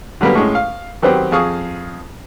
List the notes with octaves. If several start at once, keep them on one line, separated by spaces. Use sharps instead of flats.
D3 F#3 G3 A#3 B3
A2 G#3 C#4
F5
D#3 F#3 B3 C4 G4
F2 G#4 F5 C#6 D#6